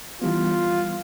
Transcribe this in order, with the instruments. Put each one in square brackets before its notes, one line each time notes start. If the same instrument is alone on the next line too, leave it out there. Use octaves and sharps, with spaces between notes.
[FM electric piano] E3 G3 B3 [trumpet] F4